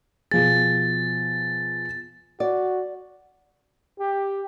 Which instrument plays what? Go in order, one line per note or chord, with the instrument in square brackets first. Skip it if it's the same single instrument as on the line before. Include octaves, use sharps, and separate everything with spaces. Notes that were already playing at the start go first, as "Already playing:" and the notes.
[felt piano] B2 F3 G#4 [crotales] A6
[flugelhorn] F#4 [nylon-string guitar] D5
[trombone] G4